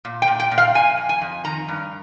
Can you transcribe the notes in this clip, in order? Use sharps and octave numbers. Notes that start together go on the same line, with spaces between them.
A#2
G5
A#2
G5
A#2
F5
F2 G#5
F2
G#5
F2
D#3 A#5
G2